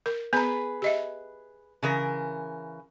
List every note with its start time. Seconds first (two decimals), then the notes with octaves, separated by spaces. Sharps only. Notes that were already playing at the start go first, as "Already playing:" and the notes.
0.06 A#4
0.33 B3 G#4 B4 A#5
0.82 G4 D#5 E5
1.83 C#3 E3 A#4